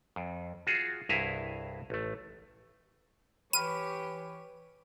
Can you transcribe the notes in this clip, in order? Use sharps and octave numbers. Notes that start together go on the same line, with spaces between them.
F2
F4 F#4 G#4
C2 G2 E4 G#4 E5 A#5
A1 A3
E3 G4 B4 C#5 B5 F6 D#7